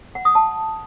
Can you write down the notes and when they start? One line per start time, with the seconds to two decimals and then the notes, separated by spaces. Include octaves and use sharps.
0.15 F#5
0.25 D#6
0.35 A5